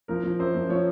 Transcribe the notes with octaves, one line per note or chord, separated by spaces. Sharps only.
F3 A#4
F3
F#2 C5
F3
F3 C#5